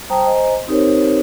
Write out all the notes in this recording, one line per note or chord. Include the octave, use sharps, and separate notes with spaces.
G3 C5 G5 A5 A#5 D#6
C5 D#5 G#5 A#5
C4 D#4 G4 A#4 C5 C#5